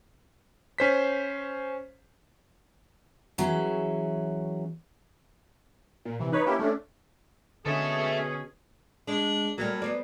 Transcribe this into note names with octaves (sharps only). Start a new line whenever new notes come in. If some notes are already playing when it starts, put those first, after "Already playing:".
C#4 C5 B6
E3 F#3 C#4 G#4 E5
A#2
C3 E3
D#4 B4 C#5
A#3 C#4 E4 G4
A3 C#4 D4
B2 D3 C#4 G#4 A4 E5
G#3 D4
F#3 G3 A3 A#3
B3 C5 D5